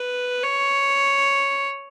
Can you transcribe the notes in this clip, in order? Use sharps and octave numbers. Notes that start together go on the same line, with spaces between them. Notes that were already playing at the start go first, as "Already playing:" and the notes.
Already playing: B4
C#5